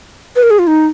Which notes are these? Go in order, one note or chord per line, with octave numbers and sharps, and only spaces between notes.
B4
A#4
G#4
F4
D#4